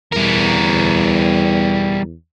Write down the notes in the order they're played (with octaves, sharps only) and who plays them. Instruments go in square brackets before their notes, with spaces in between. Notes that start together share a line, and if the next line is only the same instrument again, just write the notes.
[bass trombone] E2 [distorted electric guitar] G3 A#4